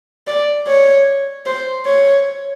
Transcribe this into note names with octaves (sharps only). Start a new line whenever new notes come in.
D5
C#5
C5
C#5